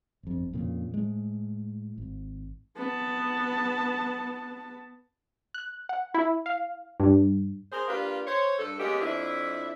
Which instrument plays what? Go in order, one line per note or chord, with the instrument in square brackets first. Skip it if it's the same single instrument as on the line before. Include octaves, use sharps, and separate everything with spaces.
[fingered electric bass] G1 F2
F2 A#2 C#3
A2 G#3
G#1
[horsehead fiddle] B3 A5
[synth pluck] F#6
F#5
E4
F5
G2
[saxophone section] G#4 A#4 C5
A#3 D4 F4 G4 B4
C5 C#5
G2 A4
G#3 A#3 B3 C#4 G4
F2 D4 E4